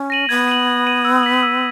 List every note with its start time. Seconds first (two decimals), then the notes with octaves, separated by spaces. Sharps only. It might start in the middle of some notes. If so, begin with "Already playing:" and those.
Already playing: C#4
0.10 A#6 D#7 F#7
0.29 B3 G#6
0.48 D#7 F#7
0.67 G#6
0.86 D#7 F#7
1.05 E6
1.23 B6 F#7
1.43 E6